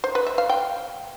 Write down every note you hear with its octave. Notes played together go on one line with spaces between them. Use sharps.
C5
B4
E5
F5
G5